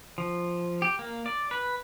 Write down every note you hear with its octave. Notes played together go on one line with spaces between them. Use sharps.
F3
G4
A#3
D5
B4